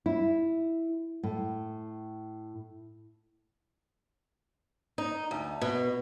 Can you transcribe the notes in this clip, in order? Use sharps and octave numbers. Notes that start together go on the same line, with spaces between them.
E4
A2
D#4
D2
B2